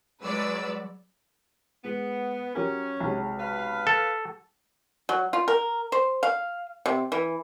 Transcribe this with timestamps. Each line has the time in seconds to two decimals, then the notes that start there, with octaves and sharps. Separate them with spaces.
0.23 F#3 G#3 B4 D5 E6
1.85 G#3 B3
2.55 F#3 C#4 G4 A#4
3.00 B1 C3 G#3
3.39 B4 F5
3.87 A4
5.09 F#3
5.33 F4
5.48 A#4
5.92 C5
6.23 F5
6.86 C3
7.12 E3